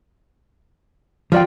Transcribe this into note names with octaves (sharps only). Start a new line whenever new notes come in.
F3 F4 D5 G5